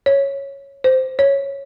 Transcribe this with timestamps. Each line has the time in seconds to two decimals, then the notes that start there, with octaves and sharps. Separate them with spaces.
0.06 C#5
0.84 C5
1.19 C#5